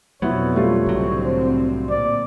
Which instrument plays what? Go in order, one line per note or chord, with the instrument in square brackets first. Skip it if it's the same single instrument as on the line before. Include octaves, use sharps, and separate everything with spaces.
[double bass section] F2 B2 D3 [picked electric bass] F#3 [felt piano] B3 E4 [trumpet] C#5
[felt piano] G3 A3 F4
[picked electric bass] C2 F#3 [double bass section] A2 D3 C4
[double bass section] A#2 [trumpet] D5